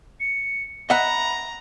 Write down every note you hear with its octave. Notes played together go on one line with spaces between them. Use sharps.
C#7
D#5 E5 F#5 A#5 B5